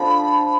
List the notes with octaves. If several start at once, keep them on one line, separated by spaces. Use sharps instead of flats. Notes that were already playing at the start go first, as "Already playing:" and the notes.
Already playing: D3 F3 B5